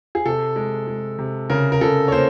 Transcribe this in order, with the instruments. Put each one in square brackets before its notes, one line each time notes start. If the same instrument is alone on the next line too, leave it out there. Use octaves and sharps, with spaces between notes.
[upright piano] G#4
C3 A4
G#3
G#3
C3
C#3 A#4
A#4
C#3 A4
C#5
A#3 C5